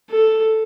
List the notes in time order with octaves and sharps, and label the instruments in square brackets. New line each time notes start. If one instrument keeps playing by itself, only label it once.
[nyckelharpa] A4